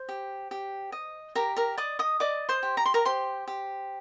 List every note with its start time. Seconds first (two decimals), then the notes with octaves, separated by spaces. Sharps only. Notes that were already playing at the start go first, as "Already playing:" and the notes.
Already playing: C5
0.09 G4
0.51 G4
0.92 D#5
1.35 G4 A#4 A#5
1.56 A#4 A#5
1.78 D5 D#5 D6
1.99 D#5 D#6
2.20 D5 D#5 D6
2.49 C5 C6
2.63 G4
2.77 A#5
2.86 C6
2.94 A#4 A#5
3.05 G4 C5 C6
3.47 G4